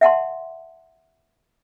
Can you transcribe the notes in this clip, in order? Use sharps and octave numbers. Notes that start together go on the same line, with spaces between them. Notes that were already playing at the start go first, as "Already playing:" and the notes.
E5 F#5 A5 C6